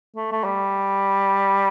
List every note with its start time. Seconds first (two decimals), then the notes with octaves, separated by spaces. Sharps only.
0.16 A3
0.32 A3
0.44 G3